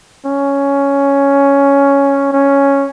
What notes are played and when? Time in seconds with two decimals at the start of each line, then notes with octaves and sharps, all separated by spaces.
0.25 C#4
2.33 C#4